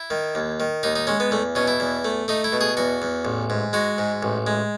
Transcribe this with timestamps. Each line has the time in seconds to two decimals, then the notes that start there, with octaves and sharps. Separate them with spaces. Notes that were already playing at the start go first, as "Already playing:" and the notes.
Already playing: E4
0.10 D#3
0.35 D#2
0.60 D#3
0.83 D#2 D#4
0.96 D#4
1.07 G#3 C#4
1.20 B3
1.31 E2 A3
1.55 B2 C#4
1.68 E4
1.80 E2
2.05 A3
2.28 A3 D#4
2.44 E4
2.52 B2
2.61 G#4
2.77 E2 F#4
3.02 E2
3.25 A1
3.50 G#2
3.73 G#3 F#4
3.98 G#2
4.23 A1
4.47 G#3